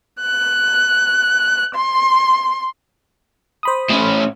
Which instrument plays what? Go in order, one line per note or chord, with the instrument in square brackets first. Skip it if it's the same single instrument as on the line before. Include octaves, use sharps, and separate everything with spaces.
[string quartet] F#6
C6
[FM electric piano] C5 B5 D#6
[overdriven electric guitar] A2 C#4